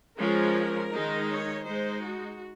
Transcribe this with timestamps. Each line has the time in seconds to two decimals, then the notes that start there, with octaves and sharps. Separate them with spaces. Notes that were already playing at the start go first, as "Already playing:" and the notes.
0.19 F3 G#3 C#4 A#4
0.93 D#3 G#3 D#4
1.29 C#5
1.65 G#3 D#4 C5
2.02 F#4